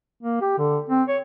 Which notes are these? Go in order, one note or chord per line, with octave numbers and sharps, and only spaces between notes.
A#3
G4
D3
C4
C#5